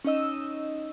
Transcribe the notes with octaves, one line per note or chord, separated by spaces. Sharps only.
C#4 D#4 D#5 E6